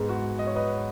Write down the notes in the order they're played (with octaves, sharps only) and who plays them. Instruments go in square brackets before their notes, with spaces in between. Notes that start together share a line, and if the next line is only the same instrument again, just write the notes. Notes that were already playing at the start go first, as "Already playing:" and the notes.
Already playing: [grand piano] G#2 G#3 B3
F#4
D#5
C#5
B4 D#5